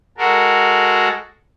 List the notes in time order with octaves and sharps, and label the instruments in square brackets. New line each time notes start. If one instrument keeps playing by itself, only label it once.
[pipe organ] G#3 F#4 A4 A#4